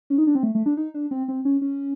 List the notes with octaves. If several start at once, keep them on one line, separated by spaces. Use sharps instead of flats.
C#4
D#4
D4
C4
A3
A3
D4
D#4
D4
C4
C4
C#4
C#4